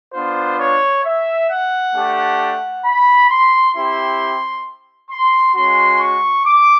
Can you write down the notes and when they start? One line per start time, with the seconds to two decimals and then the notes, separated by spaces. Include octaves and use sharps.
0.14 B3 D4 F4 C5
0.59 C#5
1.04 E5
1.49 F#5
1.95 A3 D4 G4
2.85 B5
3.30 C6
3.75 C4 E4 G4 C6
5.10 C6
5.55 G#3 C#4 F#4 C6
6.00 C#6
6.46 D6